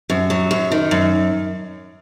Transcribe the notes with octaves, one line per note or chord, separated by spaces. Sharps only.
F#2
F#3
F#2
D#3
F#2